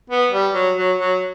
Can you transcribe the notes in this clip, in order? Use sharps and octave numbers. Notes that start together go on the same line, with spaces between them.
B3
G3
F#3
F#3
F#3